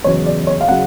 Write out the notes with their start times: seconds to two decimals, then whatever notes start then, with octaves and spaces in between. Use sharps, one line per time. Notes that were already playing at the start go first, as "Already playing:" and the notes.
0.04 E2 C#3 F#3 C#5
0.26 D5
0.47 C#5
0.61 F5
0.69 C#3 F#3 F#5